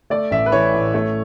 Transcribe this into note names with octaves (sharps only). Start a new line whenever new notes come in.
A3 D5
A1 E5
B4
E3 C#5
A2
A3